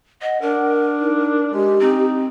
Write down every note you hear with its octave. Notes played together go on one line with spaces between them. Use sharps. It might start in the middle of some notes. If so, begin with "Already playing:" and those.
D#5 F#5
D4 A#4
D#4
G#3 G4
C4 D#4